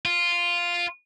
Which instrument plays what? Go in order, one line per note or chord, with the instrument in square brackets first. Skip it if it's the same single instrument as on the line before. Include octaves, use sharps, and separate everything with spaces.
[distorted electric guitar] F4